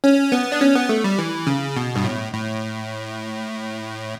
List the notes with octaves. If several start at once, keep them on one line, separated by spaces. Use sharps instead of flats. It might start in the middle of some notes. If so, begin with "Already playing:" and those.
C#4
B3
D4
C#4
B3
A3
G3
E3
C#3
B2
G2
A2
A2